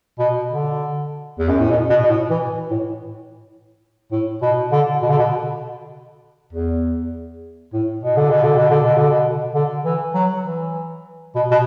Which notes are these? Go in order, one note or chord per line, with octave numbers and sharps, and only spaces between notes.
B2
D3
E2
F#2
A2
B2
B2
B2
A2
E3
A2
A2
B2
D3
B2
D3
B2
E2
A2
B2
D3
B2
D3
B2
D3
B2
D3
B2
D3
E3
F#3
E3
B2
B2